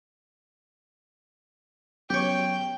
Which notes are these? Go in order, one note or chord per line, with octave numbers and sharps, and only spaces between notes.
F#3 B3 C#4 G4 C#5 G5